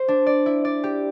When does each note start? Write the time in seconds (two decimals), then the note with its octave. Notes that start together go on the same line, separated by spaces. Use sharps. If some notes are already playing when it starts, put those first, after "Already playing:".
Already playing: C5
0.08 D4
0.26 D5
0.46 E4
0.65 D5
0.84 G4